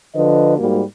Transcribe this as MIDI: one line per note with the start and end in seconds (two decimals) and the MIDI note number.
0.15 0.56 50
0.15 0.56 53
0.15 0.56 71
0.15 0.56 75
0.57 0.82 44
0.57 0.82 55
0.57 0.82 58
0.57 0.82 66